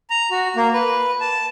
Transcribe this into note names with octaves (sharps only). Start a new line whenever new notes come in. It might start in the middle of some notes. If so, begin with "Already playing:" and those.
A#5
F#4
A#3
B4
A5